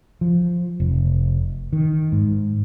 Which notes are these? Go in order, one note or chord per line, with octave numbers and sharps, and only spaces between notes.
F3
F1
D#3
G#2